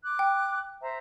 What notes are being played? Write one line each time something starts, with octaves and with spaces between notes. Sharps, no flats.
D6 F#6
G5
C5 E5 A#5